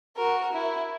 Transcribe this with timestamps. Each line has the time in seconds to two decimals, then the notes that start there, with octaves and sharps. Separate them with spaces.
0.16 F#4 A#4
0.52 E4